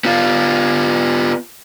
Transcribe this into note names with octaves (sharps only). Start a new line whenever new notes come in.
B3 F4